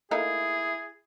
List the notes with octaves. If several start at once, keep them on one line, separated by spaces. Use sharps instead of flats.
A3 A#3 D#4 E4 G#4